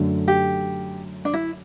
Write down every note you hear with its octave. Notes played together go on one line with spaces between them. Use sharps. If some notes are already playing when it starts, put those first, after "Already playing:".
Already playing: F#2 D3 A3
G4
D4
E4